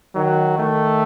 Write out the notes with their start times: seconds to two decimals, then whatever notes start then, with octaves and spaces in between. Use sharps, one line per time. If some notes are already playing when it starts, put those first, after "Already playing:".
0.15 D#3 F#3
0.58 D#3 A3